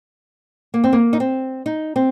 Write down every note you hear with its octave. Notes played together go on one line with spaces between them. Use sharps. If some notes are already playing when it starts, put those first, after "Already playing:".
A#3
C4
A#3
D#4
C4
D#4
C4